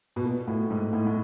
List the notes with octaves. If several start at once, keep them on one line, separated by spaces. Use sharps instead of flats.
B2
A#2
A2
G#2
A2
A2